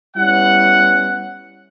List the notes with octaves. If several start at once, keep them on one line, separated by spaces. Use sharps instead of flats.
G3 B3 C#4 E4 F#5